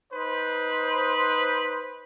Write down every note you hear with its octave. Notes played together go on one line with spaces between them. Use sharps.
D#4 B4 C5